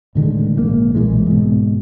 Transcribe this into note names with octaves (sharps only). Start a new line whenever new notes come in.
A2 D3 D#3 G#3
A#1 G#2 D#3 A#3
B1 A#2 E3 G#3
G#2 B2